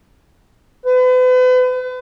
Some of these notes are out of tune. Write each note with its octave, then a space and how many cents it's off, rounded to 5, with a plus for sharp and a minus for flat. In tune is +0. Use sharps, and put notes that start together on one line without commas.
B4 +40